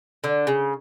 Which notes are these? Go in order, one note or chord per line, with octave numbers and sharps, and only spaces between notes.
D3
C#3